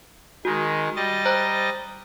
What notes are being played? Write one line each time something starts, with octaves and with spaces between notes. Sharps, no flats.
D#3 G#3 F#4
G3 D#5 A6
C5 A#5 F#6